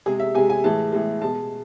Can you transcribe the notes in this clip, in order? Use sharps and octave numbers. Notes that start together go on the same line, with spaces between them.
C3 G#3 G#4
E5
C3 G#3 G#5
G#5
A2 E3 G#3 A5
A2 E3 G#3
B2 G#3 A5